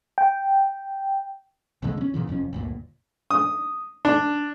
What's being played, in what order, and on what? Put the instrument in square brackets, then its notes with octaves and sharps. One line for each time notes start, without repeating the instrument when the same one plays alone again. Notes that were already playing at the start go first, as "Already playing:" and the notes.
[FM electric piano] G5
[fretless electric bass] C2 F2 D3 G#3
C4 C#4
F#1 A#2 C#3 E3
F1 F2 F3 C#4
G1 D2 A#2
[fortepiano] D#6
D4